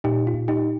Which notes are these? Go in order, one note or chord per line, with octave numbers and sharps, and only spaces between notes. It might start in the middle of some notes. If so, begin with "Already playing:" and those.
A#2 D#4 G4
F4
A#2
D#4 G4